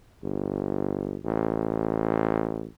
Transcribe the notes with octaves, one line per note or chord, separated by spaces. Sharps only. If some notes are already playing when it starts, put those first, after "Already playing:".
G1
A1